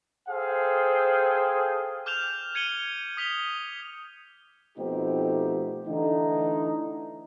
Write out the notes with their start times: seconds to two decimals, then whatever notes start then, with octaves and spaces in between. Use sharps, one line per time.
0.28 G#4 A4 C5 F5 G5
2.06 D6 F6 G6 E7 F7
2.55 G#6 C#7 D#7 F#7 G7
3.17 D#6 B6 F7 G7
4.78 B2 F3 A3 C4 D#4 G4
5.87 D3 E3 A3 D#4